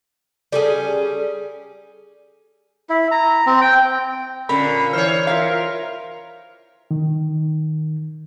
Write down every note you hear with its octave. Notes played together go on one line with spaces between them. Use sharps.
G3 C#4 G#4 A4 D5
E4
A#5
C4
G5
A#2 D3 C#4 A#4 B5
E3 C5 C#5 F6
F4 A#4 E5 F5
D#3